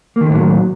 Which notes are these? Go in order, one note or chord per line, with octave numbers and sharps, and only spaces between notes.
A2 D3 D#3 F#3 A#3